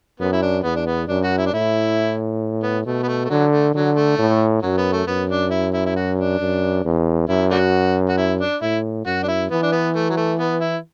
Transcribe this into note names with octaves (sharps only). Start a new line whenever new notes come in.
F#2 B3
E4
D4
E2 B3
D4
B3
F#2 D4
F#4
E4
D4
A2 E4
B3
B2 A3
B3
A3
A3
D3 F#3
A3
D3 F#3
A3
A2
F#2 F#3
B3
A3
F#2 B3
D4
E4
E4
E4
F#4
D4
F#2
E2
F#2 E4
A3 D4 F#4
F#4
E4
D4
A2 E4
F#2 F#4
D4
E4
E3 B3
D4
B3
A3
F#3
A3
B3
E4